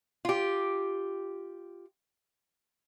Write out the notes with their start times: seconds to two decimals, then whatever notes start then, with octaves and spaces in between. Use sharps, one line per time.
0.25 F4 G4